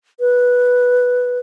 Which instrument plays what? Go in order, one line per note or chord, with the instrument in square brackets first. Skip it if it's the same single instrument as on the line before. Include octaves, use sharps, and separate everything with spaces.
[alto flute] B4